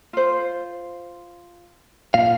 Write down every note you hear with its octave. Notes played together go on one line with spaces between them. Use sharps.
F4 C5
A#2 F5